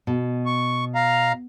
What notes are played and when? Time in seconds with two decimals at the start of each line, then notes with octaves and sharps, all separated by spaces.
0.07 B2
0.46 C#6
0.95 F5 A#5